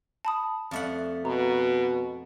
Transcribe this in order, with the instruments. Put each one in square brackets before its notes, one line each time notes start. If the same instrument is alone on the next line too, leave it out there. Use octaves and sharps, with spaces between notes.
[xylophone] A5 B5 D#6
[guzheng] F2 A3 F#5
[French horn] B2 [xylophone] A#5